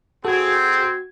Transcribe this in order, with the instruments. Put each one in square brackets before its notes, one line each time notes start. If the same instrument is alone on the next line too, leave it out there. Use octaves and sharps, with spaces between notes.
[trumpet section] C4 [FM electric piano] F#4 G#6 [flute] G#4 [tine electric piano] A4